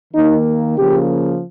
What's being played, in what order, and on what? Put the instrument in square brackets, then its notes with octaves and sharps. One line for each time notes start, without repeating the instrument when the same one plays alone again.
[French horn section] D#3 A#3 D#4
C#3 F3 A#3 G4